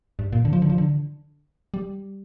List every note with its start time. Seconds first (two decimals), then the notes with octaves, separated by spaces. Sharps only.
0.19 G2
0.33 A#2
0.45 D3
0.53 F3
0.62 D3
0.70 F3
0.78 D3
1.74 G3